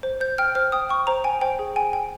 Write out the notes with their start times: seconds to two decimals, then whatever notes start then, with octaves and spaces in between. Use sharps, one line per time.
0.03 C5
0.21 C5 G6
0.38 G5 F6
0.55 C5 F6
0.72 G5 D#6
0.89 G5 C#6
1.07 C5 A#5
1.24 G5 G#5
1.41 C5 G5
1.59 G#4
1.76 G5 G#5
1.93 G5